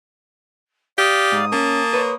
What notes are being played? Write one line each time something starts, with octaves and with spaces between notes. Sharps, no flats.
G4 D5 F5 D#6
G#2
A#3 C#4 A5
B4 C#5